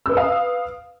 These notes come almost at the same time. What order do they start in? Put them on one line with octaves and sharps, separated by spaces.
E6 B4 D#6 F5